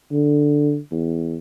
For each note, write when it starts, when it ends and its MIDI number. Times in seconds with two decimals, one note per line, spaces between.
0.12 0.78 50
0.91 1.37 40